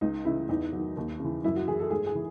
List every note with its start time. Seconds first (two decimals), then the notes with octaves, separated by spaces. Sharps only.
0.01 C#2 D#4
0.25 C#3 E3 E4
0.49 E2 D#4
0.73 D#3 F#3
0.97 D#2
1.20 C#3 E3
1.44 F#2 E4
1.56 F#4
1.68 E3 G#4
1.80 A4
1.90 G#2 G#4
2.06 G#4
2.15 E3